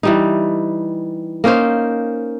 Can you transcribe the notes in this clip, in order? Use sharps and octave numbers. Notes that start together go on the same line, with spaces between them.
E3 G3 D#4
A#3 C#4 D#4 C5